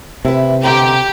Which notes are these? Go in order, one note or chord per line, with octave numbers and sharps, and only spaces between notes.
C3 E4 B4
B2 D3 G4 A#5